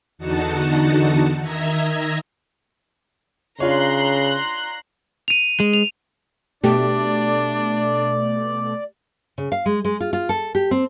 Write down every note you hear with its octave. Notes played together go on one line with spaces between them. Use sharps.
E2 D3 D#4 F#4 F#5 A5
D#3 D#5 E5 A#5 G#6
C#3 D4 F4 C#5 A#5 C6 F#6
D#7 F7
G#3
F7
B2 A3 D4 G4 D5
C#3
F5
G#3
G#3
F4
F4
A4
G4
C4